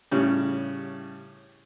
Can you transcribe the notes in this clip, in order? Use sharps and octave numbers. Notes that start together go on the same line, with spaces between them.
A2 C#3 G3